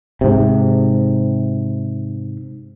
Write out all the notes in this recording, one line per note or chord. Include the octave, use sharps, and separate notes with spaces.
G#2 C3